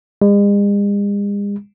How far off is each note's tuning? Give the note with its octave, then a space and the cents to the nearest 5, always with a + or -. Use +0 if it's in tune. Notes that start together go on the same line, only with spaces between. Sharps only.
G#3 -45